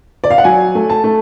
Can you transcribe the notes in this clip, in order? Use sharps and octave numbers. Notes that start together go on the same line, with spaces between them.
D5
F5
F#5
F#3 G#5
A3
A5
A3